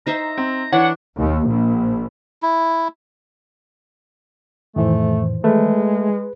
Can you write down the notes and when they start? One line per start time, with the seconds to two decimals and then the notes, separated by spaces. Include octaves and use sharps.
0.07 D#4 C5 E5 A#5
0.38 C4
0.72 E3 D4 C#5 F#5
1.17 D#2
1.47 A#1
2.43 E4
4.76 F2 A2 D#3 E3 A3 C5
5.44 G#3 A3 G#4 B4